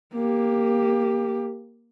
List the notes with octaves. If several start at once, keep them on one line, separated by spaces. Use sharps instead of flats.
A#3 G4